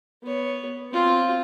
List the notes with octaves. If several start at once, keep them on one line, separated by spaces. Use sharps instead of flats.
B3 C#5
C4 F4